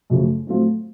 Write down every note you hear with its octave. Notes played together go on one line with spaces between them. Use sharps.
F#2 C#3 F3 A3
A2 F#3 A3 C4 F4